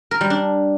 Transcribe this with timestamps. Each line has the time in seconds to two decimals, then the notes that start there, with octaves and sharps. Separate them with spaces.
0.11 A#4
0.21 G3
0.30 D4